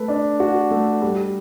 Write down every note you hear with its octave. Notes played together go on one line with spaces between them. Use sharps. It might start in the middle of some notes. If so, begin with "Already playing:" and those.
Already playing: A3 B4
D4
F#4
A3
G3